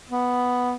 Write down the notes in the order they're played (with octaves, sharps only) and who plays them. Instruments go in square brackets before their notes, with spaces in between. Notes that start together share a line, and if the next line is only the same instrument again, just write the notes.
[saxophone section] B3